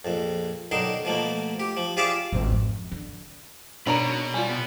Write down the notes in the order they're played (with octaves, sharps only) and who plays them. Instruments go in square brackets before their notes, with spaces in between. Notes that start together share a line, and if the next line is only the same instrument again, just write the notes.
[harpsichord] A#1 F2
B1 D3 D#3 D#4 C6
B2 F3 A3 A#3
G4
F3
F4 G4 G#4 D5 E5 F5
[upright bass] G#1
F2
D3
[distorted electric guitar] B2 [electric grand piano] D4 [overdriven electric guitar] D#4 B5 [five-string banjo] A#4 C#5 A#5
[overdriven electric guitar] G3 [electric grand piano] F4 D5 G#5
[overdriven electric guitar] B3